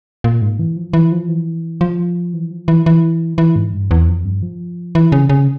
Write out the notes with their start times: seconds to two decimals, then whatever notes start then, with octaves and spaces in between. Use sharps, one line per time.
0.24 A#2
0.42 G#2
0.59 E3
0.77 F3
0.93 E3
1.12 F3
1.29 E3
1.81 F3
2.34 E3
2.51 F3
2.68 E3
2.86 E3
3.38 E3
3.56 G#2
3.73 G2
3.91 E2
4.08 F2
4.25 G2
4.42 F3
4.95 E3
5.12 C#3
5.29 C#3